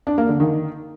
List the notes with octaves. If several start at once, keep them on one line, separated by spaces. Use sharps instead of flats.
D4
A#3
D3
D#3